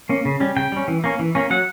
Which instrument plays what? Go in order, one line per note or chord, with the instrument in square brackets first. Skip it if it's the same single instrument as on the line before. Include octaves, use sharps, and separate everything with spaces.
[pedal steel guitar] A#3 C#4
C#3
G3 C#4
C#3 G5
G3 C#4
E3
A#3 C#4
E3
A#3 C#4
F#3 F#5